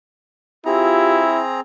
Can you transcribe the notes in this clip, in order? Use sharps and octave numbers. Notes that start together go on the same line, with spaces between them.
C4 E4 F4 G4 G#4 A#5